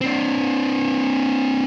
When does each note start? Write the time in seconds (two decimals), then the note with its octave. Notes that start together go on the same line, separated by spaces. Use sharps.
0.01 C4 D4